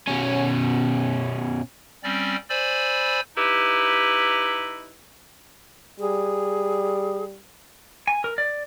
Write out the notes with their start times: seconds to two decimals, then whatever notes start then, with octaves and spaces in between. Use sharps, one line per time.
0.08 B2 C#4
2.03 G3 C4 C#4 D5
2.49 C5 D5 G#5 B5 E6
3.37 D#4 E4 G4 B4
6.00 G3 G#4
8.08 G#5
8.24 A#4
8.38 D5